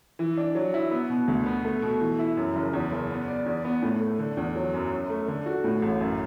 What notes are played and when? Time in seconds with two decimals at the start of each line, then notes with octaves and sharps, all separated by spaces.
0.19 E3
0.38 D4
0.55 F#3
0.74 E4
0.91 B3
1.10 B2
1.28 D2
1.46 B3
1.64 A3
1.82 B2
2.01 E3
2.19 E4
2.37 F#2
2.55 F#1
2.73 E2
2.92 F#1
3.10 B3
3.28 D5
3.46 E2
3.65 B3
3.83 A2
4.00 A3
4.19 D3
4.37 E2
4.56 F#3
4.74 F#2
4.92 F#2
5.10 A3
5.28 D3
5.46 F#4
5.64 A2
5.82 A1
6.01 F#2